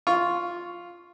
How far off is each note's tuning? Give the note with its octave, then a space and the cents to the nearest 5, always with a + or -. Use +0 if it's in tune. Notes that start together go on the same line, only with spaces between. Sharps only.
F4 +0 C#6 +5